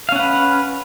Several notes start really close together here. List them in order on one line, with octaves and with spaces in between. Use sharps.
F5 C#4 F#5 B4